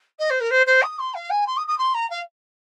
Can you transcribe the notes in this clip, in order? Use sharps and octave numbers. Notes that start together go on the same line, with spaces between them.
D#5
C5
A#4
C5
C5
D#6
C6
F5
G#5
C6
D#6
D#6
C6
A#5
F5